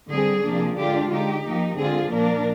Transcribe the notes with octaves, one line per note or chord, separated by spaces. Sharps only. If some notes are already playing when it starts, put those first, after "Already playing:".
D3 G3 C4 G#4
C3 F3 A#3 D4
D3 G#3 D4 F4 G4
D3 G#3 D#4 G4
F3 A#3 D#4
D3 G#3 C4 F4 G#4
A#2 F3 A#3 D4 A#4